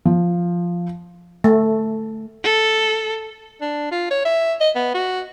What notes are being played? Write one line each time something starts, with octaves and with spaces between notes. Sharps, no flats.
F3
A3
A4
D4
F4
C#5
E5
D#5
B3
F#4